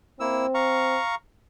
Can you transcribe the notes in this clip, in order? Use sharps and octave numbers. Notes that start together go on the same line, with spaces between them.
A#3 C4 E4 E6
F5 A#5 C#6